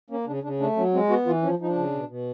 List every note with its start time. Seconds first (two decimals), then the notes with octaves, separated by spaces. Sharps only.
0.10 A#3 C#4
0.27 C#3 D4
0.43 C#3 D4
0.60 A3 D4
0.76 F#3 C#4
0.93 G#3 C4
1.09 B3 F#4
1.26 E3 F4
1.43 F3 C#4
1.59 F3 D#4
1.68 D4
1.75 C#3
1.92 B2
2.08 B2